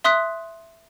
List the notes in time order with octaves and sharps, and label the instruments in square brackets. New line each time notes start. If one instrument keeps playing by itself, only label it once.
[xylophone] E5 C6 D#6 F#6 B6